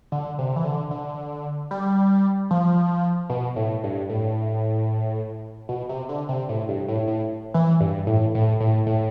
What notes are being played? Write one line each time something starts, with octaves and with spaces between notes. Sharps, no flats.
D3
C3
E3
D3
D3
G3
F3
B2
A2
G2
A2
B2
C3
D3
C3
A2
G2
A2
A2
E3
G2
A2
A2
A2
A2